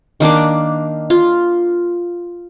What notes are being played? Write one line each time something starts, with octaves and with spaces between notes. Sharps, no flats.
D#3 A#3 D4 D6
F4